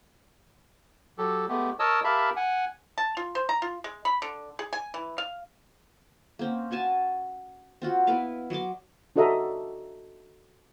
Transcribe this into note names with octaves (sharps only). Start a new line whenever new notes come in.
F#3 G4 A4
G#3 A3 B3 G4
A#4 C#5 D#5 A5 D#6 E6
G4 A#4 E5 F5 A5 B5
F#5 G#5
A5
F4
C5
A#5
F4
G#3
B5
D3
G#4
G#5
E3
F5
A#3 C4 C#4
C#4 F#4 G#5 A5
C4 F4 F#4
B3 E4 B4 F5
F#3 D#5 C6 D6
D4 F#4 A4 D#5 E5 A#5